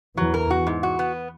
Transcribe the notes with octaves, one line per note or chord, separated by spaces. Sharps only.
E2 E3 F#3
A#4
F#4
G#2
F#4
B3